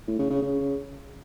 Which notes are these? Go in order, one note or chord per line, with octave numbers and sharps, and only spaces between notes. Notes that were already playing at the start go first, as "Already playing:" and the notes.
A2
C#3
C#3
C#3